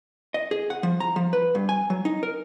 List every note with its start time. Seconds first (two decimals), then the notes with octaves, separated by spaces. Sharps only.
0.34 D#5
0.51 G#4
0.70 F#5
0.83 F3
1.00 A#5
1.16 F3
1.33 B4
1.55 G2
1.69 G#5
1.90 F#3
2.05 D#4
2.23 A#4